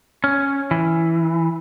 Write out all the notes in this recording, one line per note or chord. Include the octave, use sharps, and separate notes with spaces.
C#4
E3